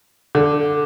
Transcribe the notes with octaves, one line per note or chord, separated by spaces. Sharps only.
D3